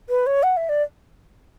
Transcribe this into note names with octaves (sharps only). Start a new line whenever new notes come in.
B4
C#5
F#5
E5
D5